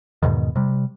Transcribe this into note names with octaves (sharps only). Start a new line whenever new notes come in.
E2 G#2 B2 D#3
C3 G3